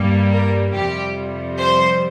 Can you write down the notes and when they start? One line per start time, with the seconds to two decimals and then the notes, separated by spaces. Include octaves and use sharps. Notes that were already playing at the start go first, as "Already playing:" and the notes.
Already playing: G2 G3 A#3
0.32 A#4
0.74 F2 C3 G3 G4
1.58 C5